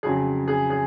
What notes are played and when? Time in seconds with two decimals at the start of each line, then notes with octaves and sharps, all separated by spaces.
0.03 F2 C#3 F#3 G#4
0.48 G#4
0.70 G#4